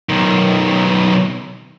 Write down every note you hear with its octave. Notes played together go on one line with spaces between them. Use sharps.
B1 D#3